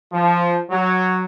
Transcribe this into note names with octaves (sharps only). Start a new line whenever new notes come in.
F3
F#3